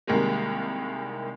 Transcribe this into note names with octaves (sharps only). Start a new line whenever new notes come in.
C2 D#3 G3 G#3 A#3